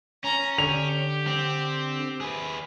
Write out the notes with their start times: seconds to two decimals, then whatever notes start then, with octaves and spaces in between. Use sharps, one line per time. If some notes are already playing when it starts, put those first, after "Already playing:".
0.24 C#4 A#5
0.58 D3 G4 F7
1.27 C4
2.21 G#4 B4